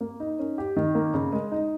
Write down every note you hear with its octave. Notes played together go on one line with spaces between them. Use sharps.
A#3
D#4
C#4
G4
D#3
A#3
C#3
G#3
D#4